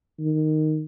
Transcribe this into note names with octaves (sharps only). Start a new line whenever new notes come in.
D#3